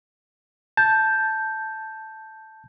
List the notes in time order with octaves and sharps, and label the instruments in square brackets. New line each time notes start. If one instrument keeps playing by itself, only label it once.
[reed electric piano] A5 [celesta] G6